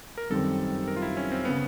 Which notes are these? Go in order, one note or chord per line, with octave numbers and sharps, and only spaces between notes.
A#4
F#2 D#3 G3 C4 A4
A#4
F4
E4
C#4
C4
C#3 B3